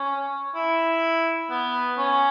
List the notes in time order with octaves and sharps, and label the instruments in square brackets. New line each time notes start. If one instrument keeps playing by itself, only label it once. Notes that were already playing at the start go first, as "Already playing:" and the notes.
Already playing: [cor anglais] C#4
E4
B3
C#4